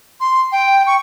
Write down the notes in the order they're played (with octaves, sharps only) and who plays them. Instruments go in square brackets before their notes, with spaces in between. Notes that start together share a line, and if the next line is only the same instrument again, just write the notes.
[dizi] C6
G5
C#6